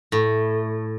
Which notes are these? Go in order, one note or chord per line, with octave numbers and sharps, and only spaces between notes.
A2